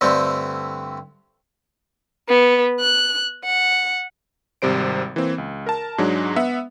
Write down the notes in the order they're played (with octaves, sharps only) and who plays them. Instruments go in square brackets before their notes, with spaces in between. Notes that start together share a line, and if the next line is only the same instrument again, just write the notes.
[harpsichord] G2 D3 G3 A3 C4
[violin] B3
F#6
F#5
[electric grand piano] G#1 C3 G3 C5 D7
E3 A#3 C4
C#2
A#4 A5
G#2 F#3 G#3 D4
B3 E5 F#5